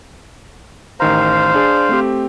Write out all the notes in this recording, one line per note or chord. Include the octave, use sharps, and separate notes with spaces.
A1 D#3 C5 F5 A#5
D4 G#4 D5
A3 C4 G4